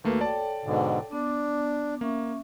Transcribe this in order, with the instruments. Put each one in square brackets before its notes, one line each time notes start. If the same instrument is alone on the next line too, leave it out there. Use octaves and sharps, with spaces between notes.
[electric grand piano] D#2 A3 A#3 [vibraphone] F#4 B4
[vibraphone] A4 C#5 G5 [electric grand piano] D5 A5
[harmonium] G#2 B2 D3
[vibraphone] B3 D6 [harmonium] D4
[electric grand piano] A#3 [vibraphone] C#4 E5 C#6